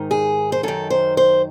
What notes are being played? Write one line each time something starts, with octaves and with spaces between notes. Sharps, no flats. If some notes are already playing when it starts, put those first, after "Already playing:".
Already playing: G#2 D#3
G#4
C5
F#2 D#3 A4
C5
C5